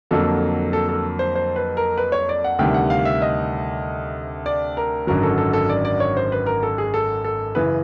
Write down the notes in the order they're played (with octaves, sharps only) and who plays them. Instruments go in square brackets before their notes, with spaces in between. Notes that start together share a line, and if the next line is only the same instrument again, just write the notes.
[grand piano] F2 D3 F#3 A#3 A4
A4
A4
C5
C5
B4
A#4
B4
C#5
D5
F#5
D2 C3 D#3 G3 G5
F#5
F5
E5
D#5
D5
A#4
G#1 F#2 D3 F#3 A#4
A4
A4
A4
D5
D5
C#5
C5
B4
A#4
A4
G#4
A4
A4
F#2 C#3 E3 B4